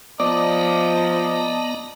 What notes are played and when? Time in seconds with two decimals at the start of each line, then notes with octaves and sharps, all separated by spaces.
0.20 F3 B3 D5 D#5 A5 A#5